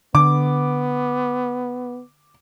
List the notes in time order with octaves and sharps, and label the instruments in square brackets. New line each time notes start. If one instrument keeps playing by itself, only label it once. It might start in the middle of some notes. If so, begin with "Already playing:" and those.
[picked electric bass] D3 [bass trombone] B3 [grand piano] D6